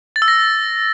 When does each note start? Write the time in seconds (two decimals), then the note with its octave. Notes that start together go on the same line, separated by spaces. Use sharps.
0.16 A6
0.22 E6
0.28 A#6